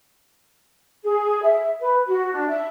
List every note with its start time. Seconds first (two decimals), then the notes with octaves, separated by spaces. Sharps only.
1.04 G#4
1.42 E5
1.80 B4
2.08 F#4
2.33 D4
2.49 E5